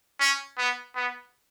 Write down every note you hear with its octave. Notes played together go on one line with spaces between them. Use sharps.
C#4
B3
B3